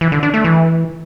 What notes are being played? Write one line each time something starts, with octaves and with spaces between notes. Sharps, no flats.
E3
D3
D4
A3
E3